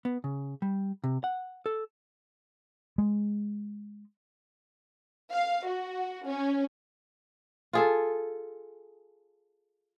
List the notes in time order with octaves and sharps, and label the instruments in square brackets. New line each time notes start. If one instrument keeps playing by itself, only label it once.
[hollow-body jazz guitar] B3
C#3
G3
C3
F#5
A4
[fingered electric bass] G#3
[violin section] F5
F#4
C#4
[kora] F4 G#4 A4